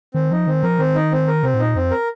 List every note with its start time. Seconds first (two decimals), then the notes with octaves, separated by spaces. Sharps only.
0.14 D#3 C4
0.31 F3 D#4
0.47 D#3 C4
0.63 F3 A#4
0.79 D#3 C4
0.95 D#4
1.12 C4
1.27 A#4
1.43 C3 C4
1.54 A2
1.59 A#2 D#4
1.75 F2 C4
1.91 A#4